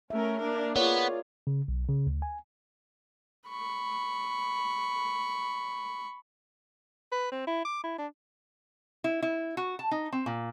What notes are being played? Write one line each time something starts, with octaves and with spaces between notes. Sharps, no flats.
A3 C#4 A#4 E5
A#3 D4 A#4
B3 F4 G#4 A#4 C#5 D5
C#3
B1
C#3
D2
G#5
B5 C#6
B4
C4
E4
D6
E4
D4
E4
E4
F#4
A5
D#4
C4
A#2